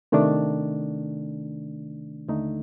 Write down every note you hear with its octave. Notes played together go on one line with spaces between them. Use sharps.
C3 D#3 A3 D4
D#2 D3 A3 D#4